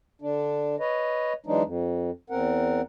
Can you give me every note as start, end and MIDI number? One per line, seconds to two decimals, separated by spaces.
0.22 0.76 50
0.22 0.76 62
0.80 1.33 71
0.80 1.33 73
0.80 1.33 75
1.46 1.63 52
1.46 1.63 54
1.46 1.63 56
1.46 1.63 62
1.46 1.63 63
1.65 2.11 41
2.30 2.81 40
2.30 2.81 60
2.30 2.81 70
2.30 2.81 78